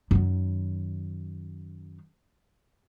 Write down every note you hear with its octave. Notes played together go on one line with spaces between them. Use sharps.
F#2 D#3